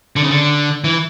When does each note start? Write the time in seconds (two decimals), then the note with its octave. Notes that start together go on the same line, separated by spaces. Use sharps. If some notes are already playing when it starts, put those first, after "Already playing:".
0.16 D3
0.22 C#3
0.30 D3
0.84 E3